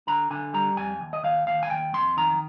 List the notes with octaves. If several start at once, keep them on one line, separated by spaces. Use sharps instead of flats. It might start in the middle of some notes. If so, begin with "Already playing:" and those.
D3 A#5
D3 G#5
G3 A#5
F2 G#5
D#2
D#5
D#2 F5
D#2 F5
G#5
D#2 G5
F2 C6
D#3 A#5